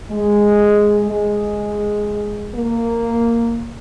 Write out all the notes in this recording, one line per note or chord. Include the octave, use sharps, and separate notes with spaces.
G#3
G#3
A#3